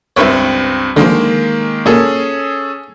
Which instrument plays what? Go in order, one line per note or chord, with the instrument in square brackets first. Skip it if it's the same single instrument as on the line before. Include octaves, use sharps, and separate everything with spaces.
[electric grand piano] C#2 G2 C4 [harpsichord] E4 B4 C#5
[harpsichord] D3 F3 [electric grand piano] D#3 G#3 A#3
[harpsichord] A#2 [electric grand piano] C#4 G#4 A4